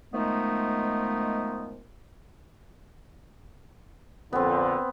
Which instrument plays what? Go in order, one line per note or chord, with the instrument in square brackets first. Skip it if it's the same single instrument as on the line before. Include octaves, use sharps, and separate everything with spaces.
[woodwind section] D#3 F3 G#3 A3 B3 D#4
[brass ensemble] F2 A#2 D3 [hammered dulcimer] B3 C4